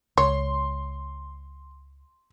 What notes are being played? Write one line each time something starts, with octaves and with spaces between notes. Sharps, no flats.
C#2 C#5 C6